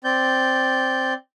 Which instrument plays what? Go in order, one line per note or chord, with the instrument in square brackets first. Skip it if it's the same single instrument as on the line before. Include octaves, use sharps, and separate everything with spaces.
[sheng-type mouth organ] C4 D5 G6